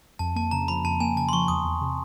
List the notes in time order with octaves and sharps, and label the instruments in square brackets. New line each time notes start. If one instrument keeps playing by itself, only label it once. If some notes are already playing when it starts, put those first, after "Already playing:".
[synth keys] F2 [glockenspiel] A5
[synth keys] A#3 [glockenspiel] A5
[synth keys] C#3 [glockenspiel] A#5
[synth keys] F3 [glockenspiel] B5
[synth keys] F2 [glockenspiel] A5
[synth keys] A#3 [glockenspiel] G#5
[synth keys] C#3 [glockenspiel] A5
[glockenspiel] C6
[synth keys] F3 [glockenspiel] C#6
[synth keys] E2 [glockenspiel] D#6
[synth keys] E2
C3